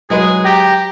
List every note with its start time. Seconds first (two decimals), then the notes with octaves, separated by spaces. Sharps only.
0.10 F#3 G#3 G#4 B4
0.45 G4 G5 A#5